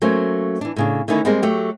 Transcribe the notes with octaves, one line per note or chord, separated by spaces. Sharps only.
F#3 A3 A#3 C#4 C5
E3 D4
A2 C#3 D4
D3 D#3 A3 C#4 D#4 E4
G3 G#3 A#3 C4 G#4 A#4
F#3 A3 G4